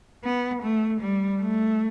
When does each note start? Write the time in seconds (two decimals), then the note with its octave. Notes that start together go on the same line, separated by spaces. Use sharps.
0.24 B3
0.63 A3
1.01 G3
1.40 A3